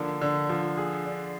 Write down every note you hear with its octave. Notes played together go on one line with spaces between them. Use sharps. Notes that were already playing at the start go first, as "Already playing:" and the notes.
Already playing: D3 F3 A#3
D3
F3
G#4
D4